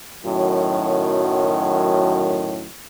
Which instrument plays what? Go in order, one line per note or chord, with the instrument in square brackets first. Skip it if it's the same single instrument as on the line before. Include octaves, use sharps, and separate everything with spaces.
[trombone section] F#2 A2 D#3 F#3